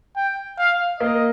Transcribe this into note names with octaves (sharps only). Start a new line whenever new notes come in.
G5
F5
A#3 D#5